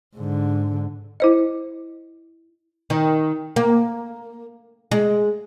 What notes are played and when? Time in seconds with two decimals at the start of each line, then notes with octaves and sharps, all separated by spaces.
0.16 G#2 D3
1.20 E4 C5 D#5
2.90 D#3
3.56 A#3
4.91 G#3